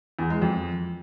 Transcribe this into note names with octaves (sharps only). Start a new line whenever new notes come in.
E2
G#3
F2